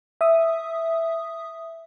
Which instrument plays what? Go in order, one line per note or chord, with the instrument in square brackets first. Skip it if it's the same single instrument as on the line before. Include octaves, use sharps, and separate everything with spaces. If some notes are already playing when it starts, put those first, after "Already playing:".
[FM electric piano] E5 D#6